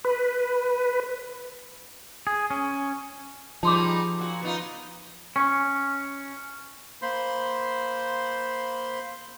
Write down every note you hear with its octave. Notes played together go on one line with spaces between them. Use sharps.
B4
G#4
C#4
F3 G3 G#3 D#4 A5 C6 D6
A#2 F#4
B3 D#4 F4
C#4
A#3 C5 B5 C6